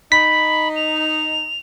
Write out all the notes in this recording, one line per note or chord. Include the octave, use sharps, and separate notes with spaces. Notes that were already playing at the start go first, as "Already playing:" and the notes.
D#4 B5 B6
F7